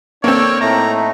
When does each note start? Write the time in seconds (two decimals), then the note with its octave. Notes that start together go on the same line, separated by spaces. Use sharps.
0.24 A#3 C4 D4 A4 C#5
0.61 A2 A3 D#4 A#5